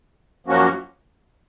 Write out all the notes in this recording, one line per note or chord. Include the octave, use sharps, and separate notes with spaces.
F#2 F3 A#3 C#4 F#4